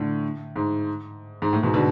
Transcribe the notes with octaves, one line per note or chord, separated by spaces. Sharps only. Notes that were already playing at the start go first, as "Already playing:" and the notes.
Already playing: A2 D3
G#2
G#2
A2
G#2 B2
B2 D3